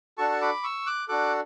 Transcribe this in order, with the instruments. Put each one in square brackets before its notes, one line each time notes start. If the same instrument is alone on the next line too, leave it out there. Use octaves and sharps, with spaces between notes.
[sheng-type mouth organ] D4 F#4 A4 A5 C#6
C#6
B5 D6
C#6 E6
D6 F#6
D4 F#4 A4 D6 F#6